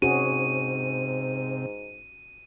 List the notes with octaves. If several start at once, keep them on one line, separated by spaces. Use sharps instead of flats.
G#2 C3 C#4 F#4 G#4 D#7